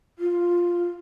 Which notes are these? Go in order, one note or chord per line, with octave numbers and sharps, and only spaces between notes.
F4